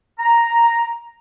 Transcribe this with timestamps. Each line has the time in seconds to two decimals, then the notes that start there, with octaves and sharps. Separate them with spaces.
0.19 A#5